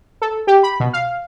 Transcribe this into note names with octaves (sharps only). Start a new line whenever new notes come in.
A4
G4
B5
B2
F5